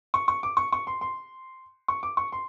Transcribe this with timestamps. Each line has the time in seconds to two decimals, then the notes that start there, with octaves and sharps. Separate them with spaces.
0.14 C#6
0.28 C#6
0.43 D6
0.57 C#6
0.72 C#6
0.87 C6
1.01 C6
1.88 C#6
2.03 D6
2.17 C#6
2.32 C6